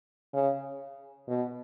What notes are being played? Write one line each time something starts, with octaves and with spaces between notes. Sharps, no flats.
C#3
B2